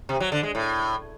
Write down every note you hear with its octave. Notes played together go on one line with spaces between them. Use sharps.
C3
F#3
D3
G#3
A2